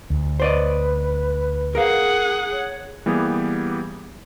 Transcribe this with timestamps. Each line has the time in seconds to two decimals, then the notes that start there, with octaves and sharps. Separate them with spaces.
0.10 D2
0.40 B4 C5 D5 D#5
1.75 G#4 A#4 F5 F#5
2.52 C#5
3.06 E3 G3 A#3 B3 G4 G#4